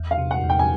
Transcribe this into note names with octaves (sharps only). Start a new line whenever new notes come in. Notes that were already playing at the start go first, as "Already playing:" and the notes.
Already playing: E2
F5
C3
F#5
E2
G5
G#5